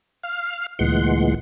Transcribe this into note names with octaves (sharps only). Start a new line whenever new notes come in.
F5 F6
D2 A#2 E3 G#3 F#5 C6